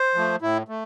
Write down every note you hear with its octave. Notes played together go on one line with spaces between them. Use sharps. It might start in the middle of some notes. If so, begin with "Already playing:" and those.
Already playing: C5
F3 A3
A2 E4
A3